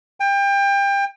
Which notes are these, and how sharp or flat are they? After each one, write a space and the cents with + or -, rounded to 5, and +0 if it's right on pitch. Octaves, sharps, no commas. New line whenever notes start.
G5 +30